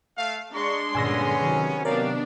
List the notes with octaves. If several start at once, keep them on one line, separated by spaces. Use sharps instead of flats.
A3 F5
G#3 D4 A#5 C6 C#6
G2 A#2 D3 B3 C#4 G#5 E6 A#6
C3 D#3 F#3
B3 D4 G4 A#4 C#5 D5 F5